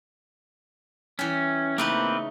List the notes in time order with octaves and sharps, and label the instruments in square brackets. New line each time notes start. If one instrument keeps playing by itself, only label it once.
[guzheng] E3 G3 [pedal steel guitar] C#4
[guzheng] C#3 A3 D#4 [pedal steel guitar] A#3 C4 B4